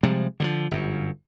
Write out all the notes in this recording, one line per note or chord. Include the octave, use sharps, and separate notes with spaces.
C3 F3 G3 G#3
D3 D#3 F3
G1 F#2